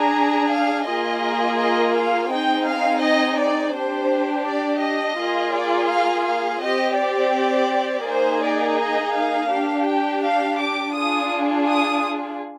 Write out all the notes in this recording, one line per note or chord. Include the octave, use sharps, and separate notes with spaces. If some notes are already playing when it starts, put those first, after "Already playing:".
Already playing: D4 G#4 A#5
F5
A#3 F4 G#4 D#5
D#5
F5
C4 D#4 G#4 G5
F5
D#5
D5
D4 G4 C5
D5
D#5
A#3 F4 G#4
D5
F5
F5
C4 G4 D#5
D5
A#3 D#4 G#4 C5
D5
D#5
F5
D4 G4
G5
F5
D6
D4 F4 G#4 D#6
D#6